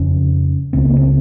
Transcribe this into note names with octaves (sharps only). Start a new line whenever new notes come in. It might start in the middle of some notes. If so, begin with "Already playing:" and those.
Already playing: F2 C#3 C#4
C#2 C#3 C4
A#3
C4